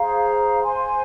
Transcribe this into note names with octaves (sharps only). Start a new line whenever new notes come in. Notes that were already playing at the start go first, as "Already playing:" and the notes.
Already playing: G#4 C5 F5 A#5
C5 G#5 C6